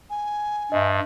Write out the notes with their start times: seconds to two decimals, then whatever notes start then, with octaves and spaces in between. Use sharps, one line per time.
0.10 G#5
0.72 G2 D#5 E5